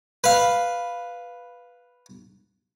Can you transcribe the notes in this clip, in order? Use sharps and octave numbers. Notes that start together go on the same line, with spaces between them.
B4 F5